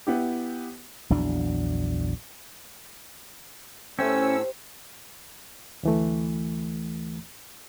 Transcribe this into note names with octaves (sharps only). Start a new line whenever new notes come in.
B3 E4 G4
A#1 E2 F#3 D4
A2 A3 C#4 G4 C5 G5 E6
D2 E3 A3